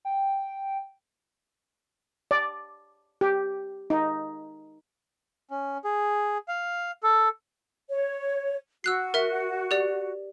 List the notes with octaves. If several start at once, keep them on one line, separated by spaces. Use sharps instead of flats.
G5
D5
G4
D#4
C#4
G#4
F5
A4
C#5
F#4 E6 F#6 C7
A#4 E5
G4 D5